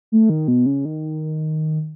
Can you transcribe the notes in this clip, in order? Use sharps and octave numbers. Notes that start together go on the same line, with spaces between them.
A3
D#3
B2
C#3
D#3